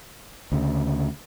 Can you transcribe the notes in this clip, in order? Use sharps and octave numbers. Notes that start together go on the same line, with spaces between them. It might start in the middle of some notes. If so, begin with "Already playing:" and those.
D2 C#3